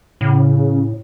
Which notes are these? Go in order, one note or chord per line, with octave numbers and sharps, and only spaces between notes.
A2 C#3